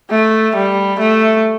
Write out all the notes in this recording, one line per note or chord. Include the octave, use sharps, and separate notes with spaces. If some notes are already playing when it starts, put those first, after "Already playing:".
A3
G3
A3